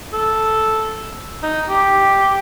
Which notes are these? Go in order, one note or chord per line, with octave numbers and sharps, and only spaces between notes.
A4
D#4
G4